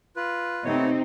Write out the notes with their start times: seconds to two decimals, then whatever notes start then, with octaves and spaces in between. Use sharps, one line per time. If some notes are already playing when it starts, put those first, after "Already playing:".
0.16 F4 B4
0.65 C3 A3 B3 C4 D#4 C#5